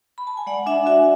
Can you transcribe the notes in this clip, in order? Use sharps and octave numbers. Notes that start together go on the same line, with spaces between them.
B5
A5
G#5
G#3 D5 F#5
D4 E5 G#5
F#4 E5 G#5